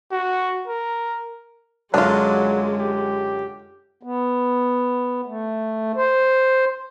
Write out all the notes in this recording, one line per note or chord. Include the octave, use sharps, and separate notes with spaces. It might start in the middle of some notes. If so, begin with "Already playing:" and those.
F#4
A#4
F#2 D3 F#3 G#3 D4 F4
G4
B3
A3
C5